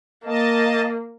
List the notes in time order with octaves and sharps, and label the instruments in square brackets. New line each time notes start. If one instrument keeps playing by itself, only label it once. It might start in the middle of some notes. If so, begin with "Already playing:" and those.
[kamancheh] A#3 [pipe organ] D#5 A5